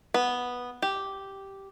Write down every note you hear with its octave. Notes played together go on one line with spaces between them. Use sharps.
B3
G4